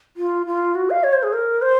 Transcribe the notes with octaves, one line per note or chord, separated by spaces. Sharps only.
F4
F4
F#4
F5
C#5
C5
G#4
A#4
C5